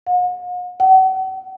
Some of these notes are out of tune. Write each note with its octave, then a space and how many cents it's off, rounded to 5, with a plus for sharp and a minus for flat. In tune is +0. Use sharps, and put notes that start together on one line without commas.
F#5 -45
F#5 +40